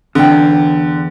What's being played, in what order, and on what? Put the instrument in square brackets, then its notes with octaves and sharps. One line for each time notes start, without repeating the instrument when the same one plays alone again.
[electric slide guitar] E2 G5 [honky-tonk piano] D3